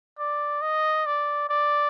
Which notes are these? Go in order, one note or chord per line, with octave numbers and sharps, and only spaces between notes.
D5
D#5
D5
D5